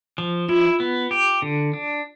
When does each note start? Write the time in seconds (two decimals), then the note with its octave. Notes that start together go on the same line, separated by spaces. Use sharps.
0.18 F3
0.49 E4 F4
0.80 B3
1.11 G4
1.42 D3
1.73 D4